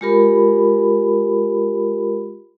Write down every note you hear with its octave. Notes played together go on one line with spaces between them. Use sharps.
G#3 F4 G4 A#4 B5